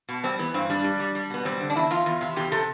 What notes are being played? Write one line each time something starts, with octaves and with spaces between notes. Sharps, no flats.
B2
G3 C4
E3 B3
G2 C4
G3 D4
G3
G3
G3
B2 B3
G3 C4
D3
D4
E2 E4
E2 F4
E2
C3
E2 G4
C3 A4